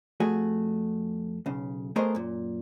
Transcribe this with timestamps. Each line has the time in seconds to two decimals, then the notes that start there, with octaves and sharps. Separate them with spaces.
0.20 F2 A3 F#4 G#4
1.46 B1 C#3
1.96 A3 B3 G#4 A#4 C5 D#5
2.15 F#2 A#2